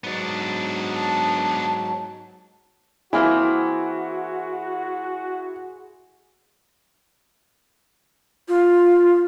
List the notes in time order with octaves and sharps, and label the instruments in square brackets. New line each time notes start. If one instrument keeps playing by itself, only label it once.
[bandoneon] G#2 F#3 [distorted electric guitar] B3 D4
[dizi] A5
[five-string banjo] E3 A#3 C4 [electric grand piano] E4 [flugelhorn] F#4 [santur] G#4 C6 D#6
[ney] F4